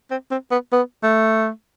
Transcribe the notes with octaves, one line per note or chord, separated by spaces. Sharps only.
C4
C4
B3
B3
A3